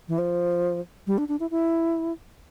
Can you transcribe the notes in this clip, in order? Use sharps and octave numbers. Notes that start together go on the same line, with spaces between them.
E3
F3
G3
D4
D4
E4
E4